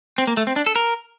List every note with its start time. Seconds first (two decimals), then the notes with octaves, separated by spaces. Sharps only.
0.18 C4
0.27 A#3
0.37 A3
0.47 C4
0.56 D4
0.66 A4
0.76 A#4